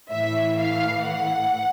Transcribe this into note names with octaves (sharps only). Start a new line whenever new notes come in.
A2 E3 E5
F5
F#5